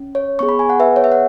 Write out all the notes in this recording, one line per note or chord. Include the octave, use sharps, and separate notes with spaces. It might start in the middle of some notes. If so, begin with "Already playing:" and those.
Already playing: C#4
C#5
B3 G#4 C#6
B5
G#5
F#5
B4 E5
C#5
E5
F#5